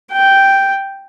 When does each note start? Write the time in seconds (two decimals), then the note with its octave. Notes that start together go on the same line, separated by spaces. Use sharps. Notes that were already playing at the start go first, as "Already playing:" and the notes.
0.12 G5